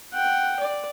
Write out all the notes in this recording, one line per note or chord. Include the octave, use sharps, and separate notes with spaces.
F#5 G5
D5